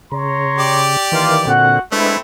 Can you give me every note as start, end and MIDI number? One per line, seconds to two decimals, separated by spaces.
0.12 0.97 49
0.12 0.84 73
0.12 0.84 82
0.12 0.84 84
0.58 1.50 67
0.58 1.50 74
1.12 1.46 51
1.12 1.46 52
1.12 1.33 58
1.12 1.33 65
1.47 1.79 46
1.47 1.79 50
1.47 1.79 60
1.47 1.79 66
1.47 1.79 78
1.92 2.17 56
1.92 2.17 57
1.92 2.16 60
1.92 2.17 62
1.92 2.16 64
1.92 2.17 71